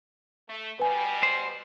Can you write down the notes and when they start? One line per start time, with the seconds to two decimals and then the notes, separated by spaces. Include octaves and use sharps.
0.48 A3
0.80 B2 G3 B4 G#5
1.23 C5